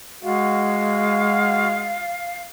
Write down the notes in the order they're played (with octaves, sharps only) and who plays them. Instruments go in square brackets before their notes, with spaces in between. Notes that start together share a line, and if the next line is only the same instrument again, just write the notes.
[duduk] G#3 [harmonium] F#4 [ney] F5